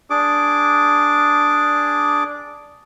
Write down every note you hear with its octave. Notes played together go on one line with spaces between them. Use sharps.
D4 G#4 D6